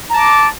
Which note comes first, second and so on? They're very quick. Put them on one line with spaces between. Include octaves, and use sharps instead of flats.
A#5 A5 D6